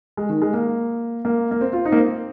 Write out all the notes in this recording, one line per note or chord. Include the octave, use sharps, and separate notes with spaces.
G#3
D#3
G#3
A#3
A#3
A#3
C4
F4
D#4
A#3
C4